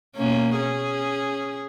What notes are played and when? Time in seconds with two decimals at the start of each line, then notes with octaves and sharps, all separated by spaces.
0.16 B2 A#3 C#4
0.56 C#4 G#4